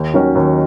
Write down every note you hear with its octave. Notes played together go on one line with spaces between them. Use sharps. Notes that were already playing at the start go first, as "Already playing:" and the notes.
Already playing: D#2
D#3 F#3 C#4 F#4
D#2